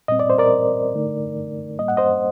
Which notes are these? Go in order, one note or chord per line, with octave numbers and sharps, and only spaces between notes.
A#2 G3 C4 D#5
D5
C5
A#4 D5
D3 A3 D#4
A2 G3 A#3 D#5
F#5
C5 D#5